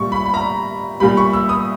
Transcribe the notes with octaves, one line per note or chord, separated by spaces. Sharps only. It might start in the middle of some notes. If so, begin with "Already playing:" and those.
Already playing: A#2 G3 C#6
B5
B5
A#5
A#2 G3 B5
C#6
E6
D#6